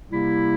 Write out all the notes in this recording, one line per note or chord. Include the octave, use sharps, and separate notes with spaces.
C3 G3 A#3 E4